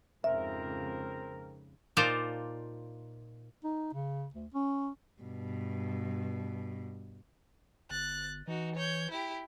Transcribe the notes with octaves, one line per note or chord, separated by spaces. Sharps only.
F2 G#2 C#3 C4 A#4 E5
A#2 D#4 F4 C5 D5 A5
D#4
C#3
D2
C#4
G2 B2
G1 F#6 A6
E3 D#4 F#4
C#5 G6
E4 G4